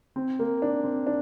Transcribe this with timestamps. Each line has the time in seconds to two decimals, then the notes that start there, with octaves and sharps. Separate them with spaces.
0.16 C4
0.39 A#3
0.62 D4
0.84 C4
1.07 D4